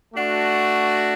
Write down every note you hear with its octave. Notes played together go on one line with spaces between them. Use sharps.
A3 D4 F#4